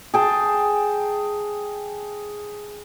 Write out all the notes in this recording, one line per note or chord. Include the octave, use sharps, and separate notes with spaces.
G#4 G5 A5